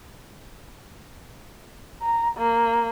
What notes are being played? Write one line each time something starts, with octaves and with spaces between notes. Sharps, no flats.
A#5
A#3